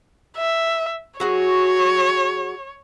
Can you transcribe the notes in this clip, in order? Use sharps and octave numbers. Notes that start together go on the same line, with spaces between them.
E5
F#3 F#4 G#4 C#5